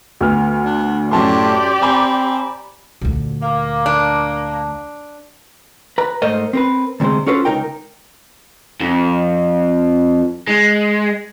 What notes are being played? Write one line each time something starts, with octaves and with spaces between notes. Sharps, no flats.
D2 B3 F6
D4
F#2 A2 G4 D5 A5 C6
C4 G#5 A#5 B5
D2 A#2
A#3 F5 D6
D4 A5
B4 A#5
G#2 A3 A#4 C5 D#5
C4 A#4 B4
D2 C3 F#3 G#3 C5
C#4 F4 F#4 A4 B4 C5
C#2 F#2 D#4 A#4 G5
F2
G#3